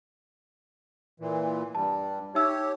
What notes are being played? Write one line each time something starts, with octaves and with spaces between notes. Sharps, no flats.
A#2 E3
G2 G3 A5
D#4 G4 C#5 E5 E6